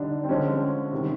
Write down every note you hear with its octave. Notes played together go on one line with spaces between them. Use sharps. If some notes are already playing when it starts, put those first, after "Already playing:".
Already playing: D3 G3 D4 D#4
C4
D3 F3 G#3 C#4
C3 D#3 G3